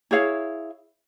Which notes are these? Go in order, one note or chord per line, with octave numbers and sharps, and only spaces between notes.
E4 G#4 C#5 F5